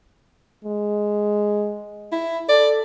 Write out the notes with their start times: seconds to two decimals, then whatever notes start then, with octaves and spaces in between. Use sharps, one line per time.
0.64 G#3
2.12 E4
2.49 A4 D5